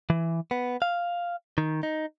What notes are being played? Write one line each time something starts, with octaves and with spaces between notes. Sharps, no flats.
E3
B3
F5
D#3
D#4